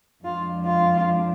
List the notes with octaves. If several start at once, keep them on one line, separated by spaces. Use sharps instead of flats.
F2 F3 G#3 D4 F4
F4